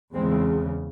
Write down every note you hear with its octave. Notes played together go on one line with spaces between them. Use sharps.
E2 C#3 G#3 C4